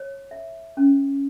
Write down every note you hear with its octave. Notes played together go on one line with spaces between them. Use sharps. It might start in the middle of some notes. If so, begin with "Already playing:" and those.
Already playing: C#5
E5
C#4